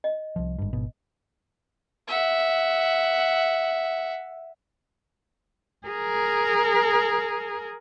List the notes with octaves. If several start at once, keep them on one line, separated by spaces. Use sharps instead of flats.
D#5
C2 F3
G#1 G2
G#1 B2
E5 F#5
G#4 A#4